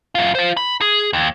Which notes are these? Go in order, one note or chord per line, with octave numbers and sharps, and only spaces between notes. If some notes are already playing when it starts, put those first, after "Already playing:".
F#2 F4
F4 C5
B5
G#4
D#2